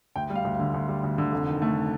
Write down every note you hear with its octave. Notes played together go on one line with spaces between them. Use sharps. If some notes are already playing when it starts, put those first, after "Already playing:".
D2 G5
G3
F5
D2
D3 F5
D2
G3
D2
D3
F1
D#3
A3